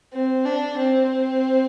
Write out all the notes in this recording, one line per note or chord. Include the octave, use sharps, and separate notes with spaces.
C4
D4
C4